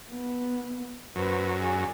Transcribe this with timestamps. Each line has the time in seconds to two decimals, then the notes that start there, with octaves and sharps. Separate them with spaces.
0.11 B3
1.16 F#2 B4 C5
1.60 G#4 D5